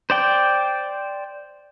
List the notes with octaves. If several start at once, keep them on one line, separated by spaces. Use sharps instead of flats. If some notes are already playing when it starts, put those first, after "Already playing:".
C5 D5 G5